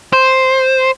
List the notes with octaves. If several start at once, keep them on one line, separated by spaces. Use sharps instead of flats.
C5